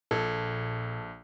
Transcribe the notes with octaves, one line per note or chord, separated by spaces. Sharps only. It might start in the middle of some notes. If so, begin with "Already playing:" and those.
A#1 A#2 A4 G#6